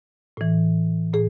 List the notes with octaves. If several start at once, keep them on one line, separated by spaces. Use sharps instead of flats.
A2 E3
A2 G#4